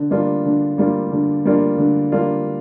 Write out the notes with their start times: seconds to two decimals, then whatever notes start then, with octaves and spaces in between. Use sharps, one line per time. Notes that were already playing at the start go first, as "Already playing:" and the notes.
Already playing: D3
0.10 G3 A#3 D4 F4
0.45 D3
0.78 G3 A#3 D4 F4
1.12 D3
1.45 G3 A#3 D4 F4
1.78 D3
2.12 G3 A#3 D4 F4